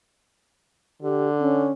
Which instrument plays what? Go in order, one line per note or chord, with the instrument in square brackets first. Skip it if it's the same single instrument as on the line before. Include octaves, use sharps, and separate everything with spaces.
[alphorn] D3 [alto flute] G4
[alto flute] C#4